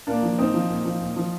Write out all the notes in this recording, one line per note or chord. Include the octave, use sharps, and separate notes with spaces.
A#2 A#3 D4
F3
A#2 C4 D#4
F3
A#2
F3
A#2
F3